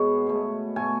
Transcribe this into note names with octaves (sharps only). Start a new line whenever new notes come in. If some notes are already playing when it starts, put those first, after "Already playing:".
Already playing: B2 G#3 B3 C#5
B2 A3
B2 A3 G#5